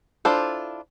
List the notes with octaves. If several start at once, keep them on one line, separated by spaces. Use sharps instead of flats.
D4 E4 F4 A4 C5